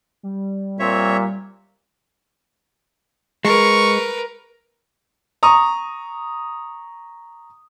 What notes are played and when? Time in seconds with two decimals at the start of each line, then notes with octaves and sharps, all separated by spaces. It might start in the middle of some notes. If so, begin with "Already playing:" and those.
0.23 G3
0.79 A#2 C4 C#5 E5
3.45 G#3 A#4 B4 C#6
5.43 A#5 C#6 D#6